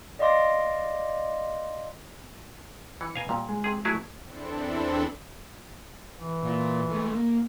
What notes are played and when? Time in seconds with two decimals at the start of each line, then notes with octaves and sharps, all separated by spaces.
0.19 D5 D#5 F5 C6 D6 A#6
3.01 E3 C#7
3.15 B2 F5 G#5 A#5
3.29 A#2 G3
3.49 G#3
3.64 C3 G#4
3.85 F#3 A3 E4 G#4
4.22 E2 C4 D4 E4 A4
6.19 E3
6.43 A#2 F4
6.90 G#3 A3
7.13 A#3